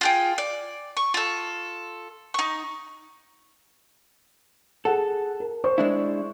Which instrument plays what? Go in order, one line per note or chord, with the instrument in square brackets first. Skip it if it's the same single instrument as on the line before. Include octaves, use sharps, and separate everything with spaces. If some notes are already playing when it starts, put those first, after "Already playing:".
[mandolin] F4 G#4 G5
D5
C#6
F4 A4
D#4 C#6
[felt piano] G#4 F#5 [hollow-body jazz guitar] A4
[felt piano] A#4
C5 C#6
[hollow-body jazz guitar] G#3 D4 E4